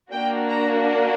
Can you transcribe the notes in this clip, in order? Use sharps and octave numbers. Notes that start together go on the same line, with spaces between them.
A#3 D4 F#4 G5
A#5